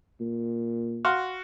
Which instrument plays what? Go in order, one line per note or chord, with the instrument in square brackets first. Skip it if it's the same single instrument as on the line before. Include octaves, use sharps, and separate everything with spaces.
[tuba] A#2
[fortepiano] F#4 F5 C6